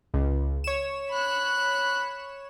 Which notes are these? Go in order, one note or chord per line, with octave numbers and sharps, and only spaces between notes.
C#2
C#5 E7
B5 F#6